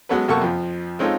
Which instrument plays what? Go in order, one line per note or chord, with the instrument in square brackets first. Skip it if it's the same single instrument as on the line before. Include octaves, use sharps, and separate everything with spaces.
[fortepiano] F#3 G#3 B3 C#4 A4 B4
F#2 C3 A#3 A4 F#5 C#6
F2 F3
G#3 C4 C#4 D#4 F4 A4